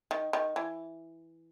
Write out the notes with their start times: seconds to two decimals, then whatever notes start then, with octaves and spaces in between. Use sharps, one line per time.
0.11 D#3
0.33 D#3
0.56 E3